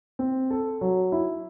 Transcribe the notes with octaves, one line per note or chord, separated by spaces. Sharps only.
C4
A4
F#3
E4